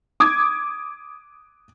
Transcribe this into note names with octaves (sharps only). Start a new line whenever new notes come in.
D6 D#6 G#6